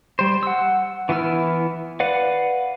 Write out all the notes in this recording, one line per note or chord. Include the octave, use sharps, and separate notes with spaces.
G3 C5
F#5 E6
E3 B3 E4 E6 F6
B4 D5 F5 F#5